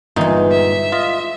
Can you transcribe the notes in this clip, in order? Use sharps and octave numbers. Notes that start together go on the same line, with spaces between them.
G1 A#2 E3 G#3 D#4
E5
F4 D#5